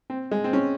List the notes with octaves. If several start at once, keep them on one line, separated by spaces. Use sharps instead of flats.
C4
G#3
C4
C#4